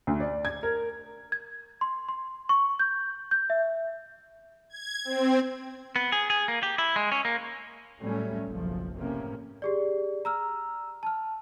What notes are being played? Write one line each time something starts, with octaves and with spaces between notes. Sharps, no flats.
D2
D5
G#6
A#4
G#6
C6
C6
C#6
G6
G6
E5
G#6
C4
B3
G#4
G#4
A#3
G4
E4
G#3
C#4
A#3
A2 F#3 G3 A3 C#4
F#1 B1 F3
A2 C3 A#3 C#4
G4 G#4 D5
A#5 E6 F6
A5 F6